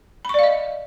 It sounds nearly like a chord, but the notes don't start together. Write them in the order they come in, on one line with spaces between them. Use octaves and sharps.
B5 C#6 D5 F5 D#5